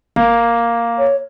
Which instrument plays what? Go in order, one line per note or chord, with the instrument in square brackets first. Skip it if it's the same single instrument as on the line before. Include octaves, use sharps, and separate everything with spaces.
[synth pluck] G#1 [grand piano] A#3
[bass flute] C#5